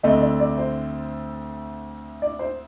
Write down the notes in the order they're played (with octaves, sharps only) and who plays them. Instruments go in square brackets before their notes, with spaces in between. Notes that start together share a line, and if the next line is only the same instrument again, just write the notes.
[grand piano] D2 D3 A3 C4 [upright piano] D#5
[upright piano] D5
D5
C5
D5
C5